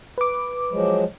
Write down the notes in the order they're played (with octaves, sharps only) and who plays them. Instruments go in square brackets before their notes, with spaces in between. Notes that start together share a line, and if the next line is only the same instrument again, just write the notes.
[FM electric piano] B4 D6
[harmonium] F3 F#3 G#3